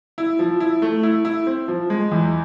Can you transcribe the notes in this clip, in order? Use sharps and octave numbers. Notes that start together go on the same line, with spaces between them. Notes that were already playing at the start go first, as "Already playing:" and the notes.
E4
F3
E4
A3
E4
E4
C4
F3
G#3
E2